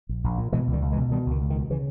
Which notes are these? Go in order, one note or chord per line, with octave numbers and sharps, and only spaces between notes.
A#1
A#1
A#2
B2 E3 G#3
C#2
D#3 G3
C#2
E3 G#3
B2
B2 D#3 G3
C#2 D#3
C#2
D#3
B2
C#3 E3